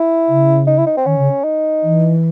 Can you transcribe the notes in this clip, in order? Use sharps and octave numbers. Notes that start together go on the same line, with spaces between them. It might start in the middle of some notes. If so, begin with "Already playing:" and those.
Already playing: E4
C#3
D#4
E4
D#4
C4
D#3 C#4
C#3
D#4
E3